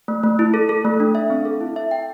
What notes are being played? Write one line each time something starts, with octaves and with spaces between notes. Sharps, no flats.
A3
A3
E4
A4
A4
A3
D4
E5
C4
A4
E4
E5
G5